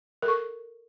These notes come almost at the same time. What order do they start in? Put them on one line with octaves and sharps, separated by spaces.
A#4 A4 C#6